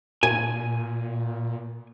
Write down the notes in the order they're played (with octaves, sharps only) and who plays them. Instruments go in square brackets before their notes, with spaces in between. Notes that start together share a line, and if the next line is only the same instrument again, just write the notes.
[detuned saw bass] A#2 [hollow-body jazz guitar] G#5